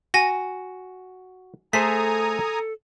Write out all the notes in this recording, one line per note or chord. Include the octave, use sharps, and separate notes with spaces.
F#4 G#5 A#6
A3 G#4 A4 C5 G#5 A#5 D#6 B6